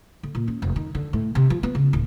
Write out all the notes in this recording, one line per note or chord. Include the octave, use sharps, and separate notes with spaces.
D3
A#2
C#4
F1
D#3
D3
A2
C3
F3
B3
C#3
D1